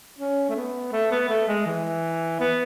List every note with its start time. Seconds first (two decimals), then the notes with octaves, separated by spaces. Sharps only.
0.19 C#4
0.49 A3
0.56 B3
0.93 A3
1.11 B3
1.29 A3
1.48 G#3
1.66 E3
2.40 B3